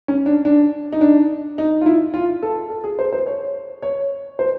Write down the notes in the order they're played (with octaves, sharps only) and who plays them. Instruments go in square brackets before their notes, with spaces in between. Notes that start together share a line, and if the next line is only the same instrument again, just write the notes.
[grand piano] C#4
D4
D4
D#4
D4
D#4
F4
E4
F4
A4
A4
G#4
C5
C5
C#5
C#5
C5